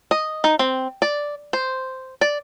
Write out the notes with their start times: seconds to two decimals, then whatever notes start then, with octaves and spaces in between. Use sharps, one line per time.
0.11 D#5
0.44 D#4
0.59 C4
1.02 D5
1.53 C5
2.21 D5